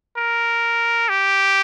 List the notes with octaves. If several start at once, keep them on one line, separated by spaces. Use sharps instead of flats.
A#4
G4